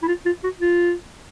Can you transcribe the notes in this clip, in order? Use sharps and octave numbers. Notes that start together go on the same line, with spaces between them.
E4
F4
F4
F#4
F4